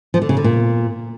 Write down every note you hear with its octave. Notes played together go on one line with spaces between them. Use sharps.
F3
D3
C#3
D3
A#2